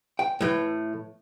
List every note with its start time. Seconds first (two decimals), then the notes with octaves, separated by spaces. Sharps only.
0.19 G5
0.41 A2 E3